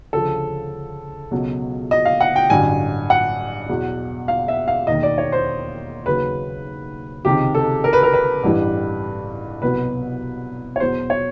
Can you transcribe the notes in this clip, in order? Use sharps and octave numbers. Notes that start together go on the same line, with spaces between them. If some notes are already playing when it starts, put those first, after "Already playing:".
D2 C#3 F3 A4
C#2 B2 F#3
D#5
F5
F#5
G5
A1 G2 D3 F#3 G#5
F#5
E2 B2 F#3
F5
E5
F5
E1 D#2 D#3 D#5
D5
C#5
C5
D#2 C#3 F#3 B4
C#2 C3 D#3 G4
A4
A#4
B4
A#4
B4
A1 G2 E3 G3
C2 B2 F#3 B4
C#5
E2 B2 F#3 C5
C#5